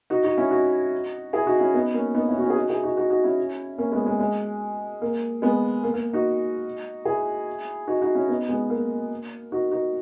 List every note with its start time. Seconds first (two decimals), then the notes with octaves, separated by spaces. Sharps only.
0.10 D#4 F#4
0.24 D#4 F#4
0.38 C#4 E4
0.51 D#4 F#4
1.33 E4 G#4
1.47 D#4 F#4
1.60 C#4 E4
1.74 B3 D#4
1.94 A#3 C#4
2.15 B3 D#4
2.29 C#4 E4
2.38 F#4
2.42 C#4 E4
2.50 G#4
2.56 D#4 F#4
2.69 E4 G#4
2.83 D#4 F#4
2.97 D#4 F#4
3.10 D#4 F#4
3.24 C#4 E4
3.78 A#3 C#4
3.92 G#3 B3
4.06 G#3
4.19 G#3
5.02 A#3
5.42 G#3 B3
5.84 A#3
5.94 A#3
6.13 D#4 F#4
7.05 E4 G#4
7.88 D#4 F#4
8.02 D#4 F#4
8.15 C#4 E4
8.28 B3 D#4
8.49 G#3 B3
8.70 A#3
9.52 D#4 F#4
9.72 D#4 F#4